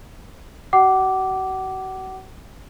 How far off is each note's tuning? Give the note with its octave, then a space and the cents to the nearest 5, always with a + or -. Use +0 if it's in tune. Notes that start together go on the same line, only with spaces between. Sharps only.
F#4 +40 F#5 +35 D6 -5